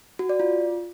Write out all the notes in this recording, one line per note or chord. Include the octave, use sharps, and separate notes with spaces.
F#4
D5
F4